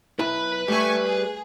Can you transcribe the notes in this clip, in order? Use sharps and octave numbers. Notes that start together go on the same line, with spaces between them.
B1 E4 B4 B5
G3 A3 E5 G#5 C#6
G#4